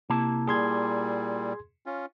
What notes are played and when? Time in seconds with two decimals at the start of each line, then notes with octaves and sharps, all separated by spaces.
0.10 C3 A#3 E4 A5
0.48 A#2 G3 G#4 C6 G#6
1.86 C#4 F4